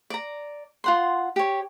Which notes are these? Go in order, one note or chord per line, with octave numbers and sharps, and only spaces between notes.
D5 A#5
F4 F#5 C6
G4 C#5